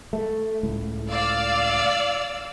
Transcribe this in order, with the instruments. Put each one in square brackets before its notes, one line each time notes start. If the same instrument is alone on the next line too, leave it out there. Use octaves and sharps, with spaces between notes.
[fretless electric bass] A3
C#2 A2
[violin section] D5 F5 E6